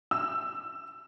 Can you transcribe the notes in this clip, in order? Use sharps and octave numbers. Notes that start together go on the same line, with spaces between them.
E6